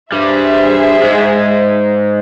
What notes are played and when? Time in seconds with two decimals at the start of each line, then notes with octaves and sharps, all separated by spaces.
0.12 G2 G3 G#4 C5 E5
1.02 G#2 G#3